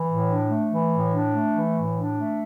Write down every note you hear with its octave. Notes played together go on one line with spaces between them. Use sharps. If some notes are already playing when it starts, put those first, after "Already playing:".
Already playing: E3
A2
D4
A3
E3
A2
D4
A3
E3
A2
D4
A3